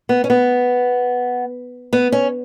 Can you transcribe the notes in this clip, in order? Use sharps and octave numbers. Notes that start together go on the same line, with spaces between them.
B3
C#4
B3
B3
C#4